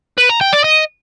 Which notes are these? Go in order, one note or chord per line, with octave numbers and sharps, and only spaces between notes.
B4
A#5
G5
D5
D#5